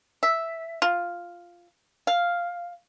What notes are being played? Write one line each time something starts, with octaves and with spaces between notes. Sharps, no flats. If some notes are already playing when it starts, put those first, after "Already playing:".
E5
F4
F5